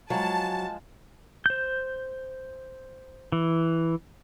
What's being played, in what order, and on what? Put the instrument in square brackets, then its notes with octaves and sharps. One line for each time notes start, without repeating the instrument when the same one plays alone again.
[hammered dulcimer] F3 G#3 [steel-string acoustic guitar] F#3 [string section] A5
[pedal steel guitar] C5 G6
E3